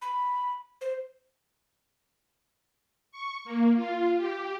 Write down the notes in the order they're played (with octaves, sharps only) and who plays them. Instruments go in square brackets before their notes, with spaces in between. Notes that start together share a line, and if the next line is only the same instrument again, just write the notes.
[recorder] B5
C5
[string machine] C#6
A#3
F4
G4